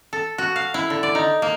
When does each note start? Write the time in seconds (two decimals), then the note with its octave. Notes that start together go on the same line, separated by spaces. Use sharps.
0.13 A4
0.38 F#4
0.56 F5
0.74 E4
0.90 D3
1.03 D5
1.15 D#4
1.42 A#3